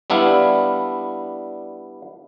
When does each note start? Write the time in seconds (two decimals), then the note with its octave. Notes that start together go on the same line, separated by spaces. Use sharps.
0.10 G3 B3 D4 E4 F5